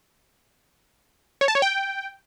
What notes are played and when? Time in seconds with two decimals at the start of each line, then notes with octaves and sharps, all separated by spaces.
1.41 C#5
1.48 A5
1.55 C#5
1.62 G5